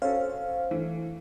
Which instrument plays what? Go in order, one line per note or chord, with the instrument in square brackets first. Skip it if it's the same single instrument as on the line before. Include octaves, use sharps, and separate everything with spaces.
[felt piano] C#4 F#4 A4 [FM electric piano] C5 F5
[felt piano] E3 A3